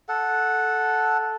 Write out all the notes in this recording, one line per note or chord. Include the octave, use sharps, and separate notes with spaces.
A4 F#5